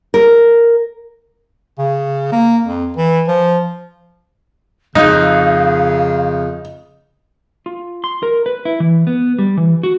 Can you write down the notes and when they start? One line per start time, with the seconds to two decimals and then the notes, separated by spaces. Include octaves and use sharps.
0.14 A#4
1.78 C#3
2.32 A#3
2.64 F2
2.97 E3
3.28 F3
4.95 F2 C#3 D#4 F5
7.66 F4
8.04 C6
8.23 A#4
8.46 B4
8.65 E4
8.80 E3
9.07 B3
9.39 G3
9.57 E3
9.83 F#4